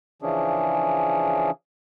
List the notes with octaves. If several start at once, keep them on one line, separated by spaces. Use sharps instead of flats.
C#3 E3 F3 C#4 D4 G#4